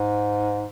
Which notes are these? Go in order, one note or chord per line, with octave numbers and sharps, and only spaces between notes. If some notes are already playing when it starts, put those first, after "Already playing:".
Already playing: G#2